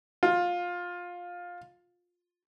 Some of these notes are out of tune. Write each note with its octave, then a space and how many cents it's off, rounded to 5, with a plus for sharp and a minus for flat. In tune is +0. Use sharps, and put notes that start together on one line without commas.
F4 +15